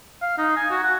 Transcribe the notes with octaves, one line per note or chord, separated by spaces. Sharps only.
F5
D#4
G#5
F#4
F#5